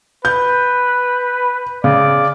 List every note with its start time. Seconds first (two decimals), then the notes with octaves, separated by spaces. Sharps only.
0.25 B4 G6
1.84 C#3 D5